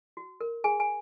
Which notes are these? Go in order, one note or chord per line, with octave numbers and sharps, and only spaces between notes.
F#4
A#4
G#4 G#5
G#5